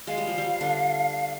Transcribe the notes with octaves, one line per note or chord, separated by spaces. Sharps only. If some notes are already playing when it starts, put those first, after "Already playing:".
G#3 F5
G3
F3
G3
D3 D4